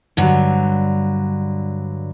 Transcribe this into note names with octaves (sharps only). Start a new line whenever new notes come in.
G2 D3 F#3